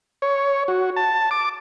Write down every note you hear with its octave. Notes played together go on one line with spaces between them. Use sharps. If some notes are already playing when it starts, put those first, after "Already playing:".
C#5
F#4
A5
D6